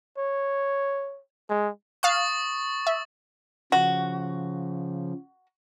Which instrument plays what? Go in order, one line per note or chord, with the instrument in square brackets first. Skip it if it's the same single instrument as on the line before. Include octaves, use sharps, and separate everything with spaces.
[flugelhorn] C#5
G#3
[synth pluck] F5 F#6 [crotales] C#6 D#6 A6
[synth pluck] E5
[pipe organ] C#3 F3 [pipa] F#4